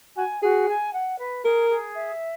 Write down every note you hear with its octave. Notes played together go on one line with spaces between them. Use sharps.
F#4 G#5
F#4 G#4
G#5
F#5
B4
G#4 A#4
G#4
E5